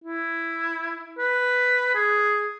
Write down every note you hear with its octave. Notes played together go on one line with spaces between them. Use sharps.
E4
B4
G#4